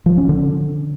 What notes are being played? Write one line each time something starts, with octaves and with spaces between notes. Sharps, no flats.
F3
C#4
D3